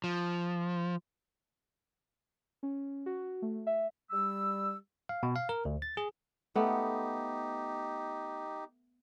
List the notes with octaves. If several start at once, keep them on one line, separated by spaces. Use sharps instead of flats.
F3
C#4
F#4
A3
E5
G3 E6
F5
B2
F5
A#4
D2
A6
G#4
A3 B3 D#4 G4